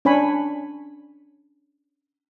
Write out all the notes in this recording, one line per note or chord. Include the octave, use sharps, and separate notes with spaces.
C#4 D4 C#5 G#5 B5